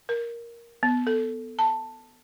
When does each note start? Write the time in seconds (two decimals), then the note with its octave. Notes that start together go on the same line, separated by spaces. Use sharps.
0.09 A#4
0.83 B3
1.07 A4
1.59 A5